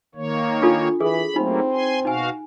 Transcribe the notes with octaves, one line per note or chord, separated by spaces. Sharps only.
D#3 A#3 C#5
D4 F4 A4
E3 G#4 A4 B5
F#3 A3 A#3 C4 D#4 B5
G#5 C6
B2 D#4 F#4 F5 G#5